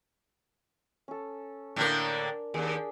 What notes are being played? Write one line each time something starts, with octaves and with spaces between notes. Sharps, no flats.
C#4 A4
A2 D3 A#3 D4 A#4
D#2 D4 G#4